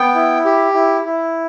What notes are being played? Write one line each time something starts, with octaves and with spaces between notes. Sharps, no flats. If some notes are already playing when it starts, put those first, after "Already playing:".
Already playing: B3 G5
E4
G4
E4
E4